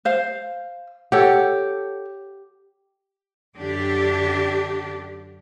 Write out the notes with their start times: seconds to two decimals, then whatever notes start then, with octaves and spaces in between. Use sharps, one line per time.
0.05 C5 F5
1.12 G4 A4 C#5 F#5
3.57 F#2 D3 D4 G4